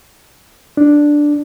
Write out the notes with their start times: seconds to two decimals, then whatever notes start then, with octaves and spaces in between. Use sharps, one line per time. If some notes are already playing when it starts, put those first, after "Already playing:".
0.77 D4